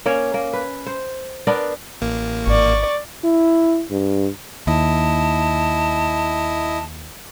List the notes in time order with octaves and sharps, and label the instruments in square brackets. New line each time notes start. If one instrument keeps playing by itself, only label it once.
[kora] A#3 C#4 C#5
A#3
B4
C5
B3 D4 A#4
[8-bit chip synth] A1 A#3
[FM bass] G#1 [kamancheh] D5 C#6
[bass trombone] E4
G2
[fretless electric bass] D#2 [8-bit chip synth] E4 D#5 [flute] A5